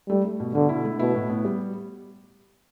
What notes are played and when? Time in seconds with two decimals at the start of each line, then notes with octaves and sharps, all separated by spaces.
0.09 G3 A3
0.25 A3
0.40 B2
0.55 B2 D3
0.69 E4
0.85 A3
0.99 B2 E4
1.14 A2
1.30 B3
1.45 G3